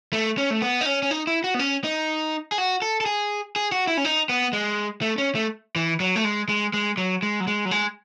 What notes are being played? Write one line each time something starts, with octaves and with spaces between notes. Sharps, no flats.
A3
C#4
A3
B3
D#4
C#4
C#4
D#4
E4
F#4
B3
C#4
D#4
G#4
F#4
A4
A4
G#4
G#4
F#4
E4
C#4
D#4
B3
G#3
A3
C#4
A3
E3
F#3
A3
G#3
G#3
G#3
F#3
G#3
F#3
G#3
F#3
G#3